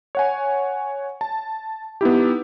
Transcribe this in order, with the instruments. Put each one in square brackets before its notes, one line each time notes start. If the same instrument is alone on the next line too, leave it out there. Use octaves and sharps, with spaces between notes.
[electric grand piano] C#5 F#5 G#5
A5
B3 D#4 E4 G4